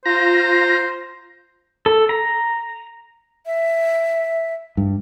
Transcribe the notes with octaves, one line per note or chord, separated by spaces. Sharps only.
F4 C5 A#5
A4
A#5
E5
G2